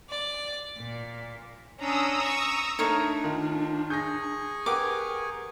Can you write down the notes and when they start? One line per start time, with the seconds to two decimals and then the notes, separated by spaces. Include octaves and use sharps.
0.10 D5
0.79 A#2
1.78 C#4 D4 A#5 D#6 E6
2.21 C#6
2.79 A3 D4 D#4 A#4 C#5 C#7 F7
3.24 D#3 F4
3.90 G#4 G#5 C#6 G6 A#6
4.66 G4 A#4 B4 F#5 D6